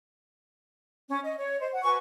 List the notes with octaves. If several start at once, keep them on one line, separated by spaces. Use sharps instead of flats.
C#4
D#5
C#5
C5 D#5
F#5
F#4 B4 G#5 C#6